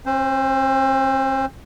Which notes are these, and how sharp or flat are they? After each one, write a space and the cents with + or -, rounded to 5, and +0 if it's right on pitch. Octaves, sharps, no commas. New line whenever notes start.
C4 +45 C5 -10